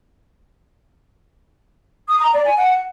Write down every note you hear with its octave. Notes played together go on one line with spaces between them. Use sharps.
D#6
A#5
D5
G#5
F#5